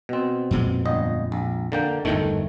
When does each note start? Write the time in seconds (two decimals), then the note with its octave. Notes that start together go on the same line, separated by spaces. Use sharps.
0.09 B2 C4
0.51 F2 A#2 G#3
0.85 G1 D#5
1.32 A#1
1.72 D3 A#3 G5
2.05 G1 E2 G#2 D#3 A3